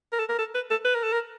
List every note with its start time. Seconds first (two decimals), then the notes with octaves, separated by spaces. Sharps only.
0.13 A#4
0.19 A4
0.29 A#4
0.39 A4
0.55 B4
0.71 A4
0.85 B4
0.95 A#4
1.04 A4
1.13 A#4